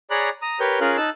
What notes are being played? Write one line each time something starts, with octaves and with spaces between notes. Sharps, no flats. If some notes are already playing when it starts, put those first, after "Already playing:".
G#4 C#5 D5 A#5 B5 F#6
A#5 D#6
G4 A#4 B4 C#5 G6
C#4 F4 G#4 A#4 F5 F#6
D#4 A5 E6 F#6